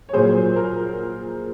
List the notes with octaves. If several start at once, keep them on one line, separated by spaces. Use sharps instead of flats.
C#5
A#2 F#3 A#3 G#4 C5
A#4